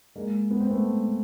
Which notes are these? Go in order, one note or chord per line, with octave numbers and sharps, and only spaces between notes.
G#3 A#3
B3
C4
A3 B3